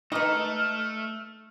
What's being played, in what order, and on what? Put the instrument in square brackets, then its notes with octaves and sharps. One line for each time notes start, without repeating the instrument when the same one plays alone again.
[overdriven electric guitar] A3 A4 [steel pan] D#4 [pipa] B4 D#5 [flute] F6